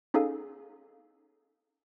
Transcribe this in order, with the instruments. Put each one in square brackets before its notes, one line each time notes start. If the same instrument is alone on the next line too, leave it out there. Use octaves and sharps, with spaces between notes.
[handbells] C#4 D#4 G#4 A4 F5 G#5